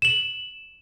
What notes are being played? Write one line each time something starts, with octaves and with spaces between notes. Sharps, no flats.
E7 F#7